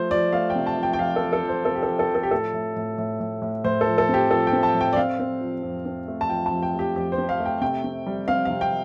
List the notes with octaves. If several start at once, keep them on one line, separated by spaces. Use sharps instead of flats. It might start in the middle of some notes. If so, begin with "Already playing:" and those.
Already playing: F3 A3 C5
F3 D5
A3 F5
G5
C3
A5
F3
G5
G5
F3 F5
A4
F3
A4
F3
C5
C3 A4
G4
F3 A4
A4
F3
A4
G4
A2 A4
A2
A2
A2
A2
A2
A2 C5
A4
F3
A4
C4
G4
F3 A4
G5
C4
A5
A2
G5
D5
C4 F5
C4
F3
F2
C4
A3
A5
F3 G5
A5
F2
G5
A3
G4
F2 G4
C5
C4
F5
A3
G5
C3 G5
C3
G3
C4 F5
C3 F5
G5